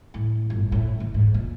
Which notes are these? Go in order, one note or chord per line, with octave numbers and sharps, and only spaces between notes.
A2
G1
A2
D#3
G#2
A#2